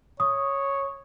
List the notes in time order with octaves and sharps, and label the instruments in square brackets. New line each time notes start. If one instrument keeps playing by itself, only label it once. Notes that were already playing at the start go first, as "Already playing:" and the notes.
[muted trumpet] C#5 [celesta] C#6 D#6